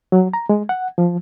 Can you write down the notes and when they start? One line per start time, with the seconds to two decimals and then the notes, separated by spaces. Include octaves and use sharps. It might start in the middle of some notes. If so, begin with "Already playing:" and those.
0.12 F#3
0.34 A#5
0.49 G#3
0.69 F#5
0.98 F3